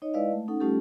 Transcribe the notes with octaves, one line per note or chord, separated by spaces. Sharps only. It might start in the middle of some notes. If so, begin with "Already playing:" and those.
D#4 C#5 D#5
G#3 E4 B4 D5 D#5 F5
A3
C#4 D#4 A4 F#5
G3 A3 C#4 F4 G4 A4